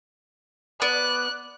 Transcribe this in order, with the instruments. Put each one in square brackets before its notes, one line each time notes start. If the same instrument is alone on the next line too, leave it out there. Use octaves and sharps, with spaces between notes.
[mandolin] B3 D5 [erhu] F#6